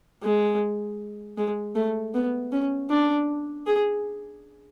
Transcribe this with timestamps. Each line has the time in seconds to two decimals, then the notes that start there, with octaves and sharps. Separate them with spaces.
0.23 G#3
1.37 G#3
1.76 A3
2.14 B3
2.52 C#4
2.90 D4
3.67 G#4